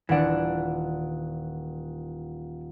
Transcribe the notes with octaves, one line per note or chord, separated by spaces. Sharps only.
D#1 E3 D4 F#5